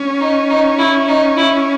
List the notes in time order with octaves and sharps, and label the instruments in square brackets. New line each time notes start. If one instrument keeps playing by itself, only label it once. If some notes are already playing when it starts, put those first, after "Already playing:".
Already playing: [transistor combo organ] C#4
[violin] D#4
D#4
E4
D#4
E4